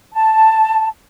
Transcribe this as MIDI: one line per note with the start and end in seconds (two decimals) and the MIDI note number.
0.14 0.87 81